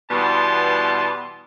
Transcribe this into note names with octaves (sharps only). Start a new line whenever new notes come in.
B2 E3 G3 B3 A5 C6